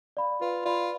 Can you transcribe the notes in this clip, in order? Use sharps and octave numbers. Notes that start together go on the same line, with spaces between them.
D5 F5 B5
F4 B4
F4 D5 F5 B5